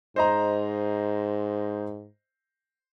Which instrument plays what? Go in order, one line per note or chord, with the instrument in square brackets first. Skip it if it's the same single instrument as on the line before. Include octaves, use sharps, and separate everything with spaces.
[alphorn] G#2 [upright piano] C5 D#5 A#5